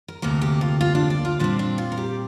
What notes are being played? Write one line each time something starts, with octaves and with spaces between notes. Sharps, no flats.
A#4
D2 C3 A#3 A#4
G4
F4
F4
D4
D5
F4
A#2 G3 C4 D4
D4
F4
A#4
G4